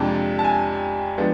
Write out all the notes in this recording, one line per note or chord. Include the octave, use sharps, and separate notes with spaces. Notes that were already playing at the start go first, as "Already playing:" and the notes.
Already playing: F2 C3 G#3 D4 A5
A5
G#5
F3 G#3 B3 D4